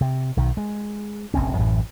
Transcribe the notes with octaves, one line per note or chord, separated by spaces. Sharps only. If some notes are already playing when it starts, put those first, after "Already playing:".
C3
B1 D#3
G#3
F1 A#1 C4 C#4
A1 F#2 A2 E3